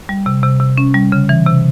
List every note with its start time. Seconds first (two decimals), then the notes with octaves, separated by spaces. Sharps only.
0.09 G3
0.26 C3
0.43 C3
0.60 C3
0.78 C#4
0.94 G3
1.12 C#3
1.29 E3
1.46 C3